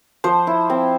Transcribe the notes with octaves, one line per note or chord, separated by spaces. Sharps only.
F3 C5
E4
C4